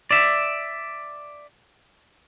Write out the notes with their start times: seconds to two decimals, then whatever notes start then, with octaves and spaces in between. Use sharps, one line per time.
0.11 D5 E5